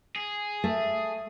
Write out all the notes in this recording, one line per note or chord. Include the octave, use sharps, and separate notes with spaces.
G#4
A3